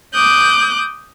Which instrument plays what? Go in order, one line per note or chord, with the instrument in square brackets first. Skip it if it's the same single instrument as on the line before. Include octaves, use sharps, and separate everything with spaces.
[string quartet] D6 D#6 F#6 G6